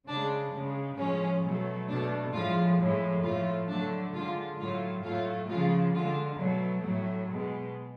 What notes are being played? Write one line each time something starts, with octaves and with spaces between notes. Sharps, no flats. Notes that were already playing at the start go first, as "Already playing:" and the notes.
C#3 G#3 D4
C#3 G#3
A2 F3 G#3 C#4
B2 F#3 A3
B2 A3 D4
A2 F3 G#3 F4
A2 F3 G#3
A2 F3 A3 F4
D3 F#3 A3 D4
D3 G#3 F4
A2 F#3 A3 F4
A2 F#3 A3 F4
C#3 F3 G#3 F4
D3 G#3 F4
B2 F#3 A3
A2 F#3 A3
B2 G#3